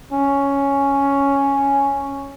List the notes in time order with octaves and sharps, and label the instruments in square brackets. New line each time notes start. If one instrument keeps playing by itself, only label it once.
[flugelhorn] C#4